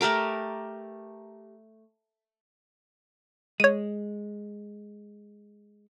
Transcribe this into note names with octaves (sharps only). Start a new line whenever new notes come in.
A3 G4 A#4 D6
G#3 C#5 D#7